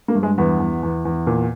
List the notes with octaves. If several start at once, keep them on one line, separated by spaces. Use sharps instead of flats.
A#3
G2
G#3
E2 B3
E2
E2
E2
A#2